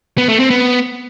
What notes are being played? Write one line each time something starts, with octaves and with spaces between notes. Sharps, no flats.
B3
A3
C4
B3